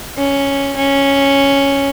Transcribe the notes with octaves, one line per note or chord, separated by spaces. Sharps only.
C#4
C#4